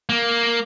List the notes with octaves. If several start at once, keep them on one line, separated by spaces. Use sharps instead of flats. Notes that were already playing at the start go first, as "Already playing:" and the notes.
A#3